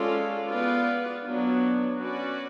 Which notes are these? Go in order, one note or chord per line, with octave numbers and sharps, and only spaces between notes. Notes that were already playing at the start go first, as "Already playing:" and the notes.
Already playing: G#3 C#4 F4 A4 D5
B3 F4 B4 D5
F#3 B3 D4
C#4 F#4 B4 D5